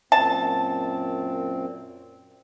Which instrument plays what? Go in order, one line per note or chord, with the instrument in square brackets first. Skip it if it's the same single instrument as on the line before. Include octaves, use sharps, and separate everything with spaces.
[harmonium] F#2 A#2 C4 [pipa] A5